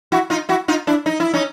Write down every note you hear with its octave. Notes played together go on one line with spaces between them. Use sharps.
E4 F#4
D#4 F4
E4 F#4
D#4 F4
D4 E4
D#4
E4
C#4 D#4